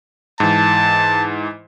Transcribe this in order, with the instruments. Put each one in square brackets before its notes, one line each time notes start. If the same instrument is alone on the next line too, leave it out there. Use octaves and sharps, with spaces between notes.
[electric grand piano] G#2 E3 [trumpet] A5